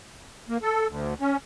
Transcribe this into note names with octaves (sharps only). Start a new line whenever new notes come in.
A#3
A4
D2
C#4